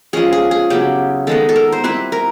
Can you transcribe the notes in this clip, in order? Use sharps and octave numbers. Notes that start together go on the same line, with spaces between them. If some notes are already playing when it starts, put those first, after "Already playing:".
F3 G#3 C#4 G#4
G#4
G#4
C#3 F#3 B3 E4 G4
D#3 G#3 B3 A4
A4
A#4
C5
G3 C4 E4 B4
A#4